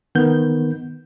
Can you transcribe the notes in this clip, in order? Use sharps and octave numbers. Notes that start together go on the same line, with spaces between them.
D#3 B3 G6